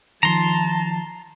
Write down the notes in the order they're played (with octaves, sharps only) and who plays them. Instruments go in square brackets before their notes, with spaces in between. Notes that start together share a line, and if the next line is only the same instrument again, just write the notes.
[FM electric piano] D#3 F3 [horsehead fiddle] A5 [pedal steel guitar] A#5 C6